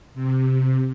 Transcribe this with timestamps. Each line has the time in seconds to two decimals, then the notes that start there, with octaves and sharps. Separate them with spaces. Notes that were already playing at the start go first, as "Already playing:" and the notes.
0.14 C3